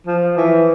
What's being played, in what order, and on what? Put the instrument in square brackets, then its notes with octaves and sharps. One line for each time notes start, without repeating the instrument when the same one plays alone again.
[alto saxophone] F3
E3